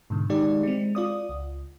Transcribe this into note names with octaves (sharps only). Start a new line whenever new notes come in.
G#2 B2 D3
D#3 G#3 D#4 G4 D5
G#3 C4
F4 D5 D#6
C#2